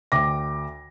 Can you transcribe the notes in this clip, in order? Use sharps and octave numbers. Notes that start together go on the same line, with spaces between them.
D2 G5 D6 A#6